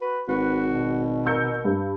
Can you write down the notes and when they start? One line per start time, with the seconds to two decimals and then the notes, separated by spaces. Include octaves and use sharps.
0.01 F#4 B4
0.28 G#1 F#4 B4
0.67 B2
1.26 A#4 E6 G6 C#7
1.65 G2